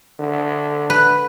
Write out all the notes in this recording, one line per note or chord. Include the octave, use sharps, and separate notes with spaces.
D3
B4